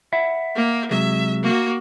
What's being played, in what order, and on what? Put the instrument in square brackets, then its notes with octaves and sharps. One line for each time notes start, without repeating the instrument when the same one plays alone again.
[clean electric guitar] E5 F#5 B5
[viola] A#3
[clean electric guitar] C3 F#3 G#3 [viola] E5
[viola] A#3 F#4